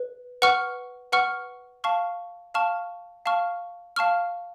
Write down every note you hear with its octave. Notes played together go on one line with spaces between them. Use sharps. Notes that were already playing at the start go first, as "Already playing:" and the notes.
Already playing: B4
B4 F#5 C#6 F6
B4 F#5 C#6 F6
F5 A5 C#6 F6
F5 A5 C#6 F6
F5 A5 C#6 F6
F5 A5 C#6 F6